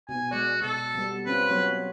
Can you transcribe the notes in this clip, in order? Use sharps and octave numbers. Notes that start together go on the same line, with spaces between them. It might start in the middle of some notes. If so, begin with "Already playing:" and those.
B2 B3 G#5
G#3 F#4 D5
B2 A4
G3 B3
C4 C#4 F4 B4
F#3 B3 C#5